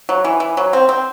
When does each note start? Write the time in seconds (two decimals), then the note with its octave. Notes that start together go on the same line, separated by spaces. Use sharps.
0.09 F#3
0.24 E3
0.40 E3
0.57 F#3
0.73 C4
0.89 C4